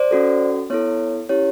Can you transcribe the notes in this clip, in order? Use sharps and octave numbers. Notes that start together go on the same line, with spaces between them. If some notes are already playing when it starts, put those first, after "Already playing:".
Already playing: C5 D5
C#4 F#4 A4
B3 E4 A4 C#5
C#4 E4 G4 C#5